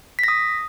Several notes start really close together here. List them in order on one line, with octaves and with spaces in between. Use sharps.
B6 A#6 D#6